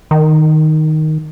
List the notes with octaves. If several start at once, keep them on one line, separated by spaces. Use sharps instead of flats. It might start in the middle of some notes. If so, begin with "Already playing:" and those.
D#3